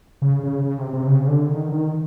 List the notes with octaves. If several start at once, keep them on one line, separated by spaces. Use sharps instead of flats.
C#3
C#3
C#3
C3
C3
C#3
D3
D#3
D#3